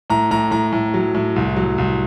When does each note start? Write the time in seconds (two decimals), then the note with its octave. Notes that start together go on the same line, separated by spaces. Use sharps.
0.10 A2 A#5
0.31 A2 A#5
0.51 A2 A#5
0.73 A2
0.94 F#3
1.15 A2
1.36 C2
1.56 F#3
1.78 C2